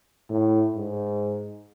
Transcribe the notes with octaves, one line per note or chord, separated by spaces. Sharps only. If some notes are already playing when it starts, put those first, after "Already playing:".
A2
G#2